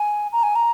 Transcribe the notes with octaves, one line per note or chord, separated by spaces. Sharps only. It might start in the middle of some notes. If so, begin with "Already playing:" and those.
Already playing: G#5
A#5
G#5
A#5